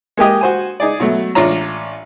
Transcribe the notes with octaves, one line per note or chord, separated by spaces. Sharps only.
G#3 A#3 G4 D#5
F#4 C5 G#5
D#4 G#4 D5
B2 F#3 A3
A1 D4 F4 C#5 A#5